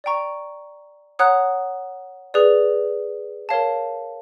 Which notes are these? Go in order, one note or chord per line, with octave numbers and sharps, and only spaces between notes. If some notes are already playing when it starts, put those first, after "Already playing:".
D5 G5 A#5 C#6
C#5 F#5 A#5 D#6 F#6
G#4 B4 D5
A#4 C#5 F5 A5